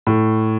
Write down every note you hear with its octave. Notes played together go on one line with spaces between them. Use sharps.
A2